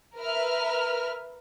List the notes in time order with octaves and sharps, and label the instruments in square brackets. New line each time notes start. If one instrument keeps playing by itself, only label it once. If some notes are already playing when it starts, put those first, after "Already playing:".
[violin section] A#4 B4 E5 F6